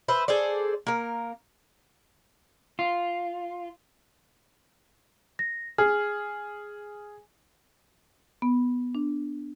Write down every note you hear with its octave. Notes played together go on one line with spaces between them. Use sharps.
B4 C5 E5
G#4 A4 C5 D5
A#3 A#4
F4
A#6
G#4 F6
B3
D4